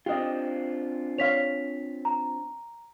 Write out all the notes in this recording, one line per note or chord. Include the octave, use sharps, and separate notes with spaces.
C4 D4 F4 G4 D#5
C#5 D5 F5 B6 F7
A#5